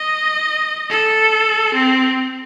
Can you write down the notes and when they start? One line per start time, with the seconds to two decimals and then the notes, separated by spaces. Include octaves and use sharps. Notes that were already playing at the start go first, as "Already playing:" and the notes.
Already playing: D#5
0.90 A4
1.74 C4